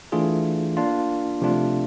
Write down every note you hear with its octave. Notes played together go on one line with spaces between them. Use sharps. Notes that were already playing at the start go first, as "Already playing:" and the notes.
E3 A3 D4 F4 G#4
A#3 D4 F4
C3 F3 A3 D4 F4